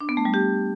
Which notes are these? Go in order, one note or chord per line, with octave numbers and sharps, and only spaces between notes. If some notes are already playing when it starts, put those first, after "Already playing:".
D4
B3
A3
G3
G4